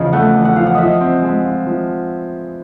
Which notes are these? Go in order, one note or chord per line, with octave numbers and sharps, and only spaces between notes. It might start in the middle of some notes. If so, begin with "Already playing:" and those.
Already playing: E2 C#3 F3 D#5
A3 F#5
E2
F#5
F3 F5
F#5
F3 D#5 E5
C4
G#3
F4
F3